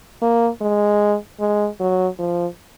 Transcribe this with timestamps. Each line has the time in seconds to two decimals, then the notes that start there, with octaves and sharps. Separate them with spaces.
0.22 A#3
0.61 G#3
1.40 G#3
1.80 F#3
2.19 F3